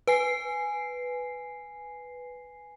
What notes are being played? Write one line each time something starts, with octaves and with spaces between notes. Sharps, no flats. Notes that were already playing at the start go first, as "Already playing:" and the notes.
B4 G#5 C7